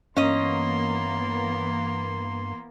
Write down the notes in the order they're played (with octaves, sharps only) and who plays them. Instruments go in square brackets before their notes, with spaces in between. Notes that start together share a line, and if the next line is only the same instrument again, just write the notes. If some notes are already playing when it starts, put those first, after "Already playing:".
[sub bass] G2 [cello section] E3 A#3 B3 [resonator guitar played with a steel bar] C#4 D#5 [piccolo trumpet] C6